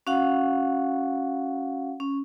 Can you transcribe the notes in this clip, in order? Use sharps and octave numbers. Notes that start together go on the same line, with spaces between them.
C#4 F#4 F5 F#5
C#4